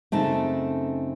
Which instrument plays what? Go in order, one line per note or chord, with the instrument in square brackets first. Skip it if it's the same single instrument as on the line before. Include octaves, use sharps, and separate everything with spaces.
[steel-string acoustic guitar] F#2 C#3 A3 C4 D#4 A5